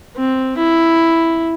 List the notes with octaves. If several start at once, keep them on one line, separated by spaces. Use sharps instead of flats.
C4
E4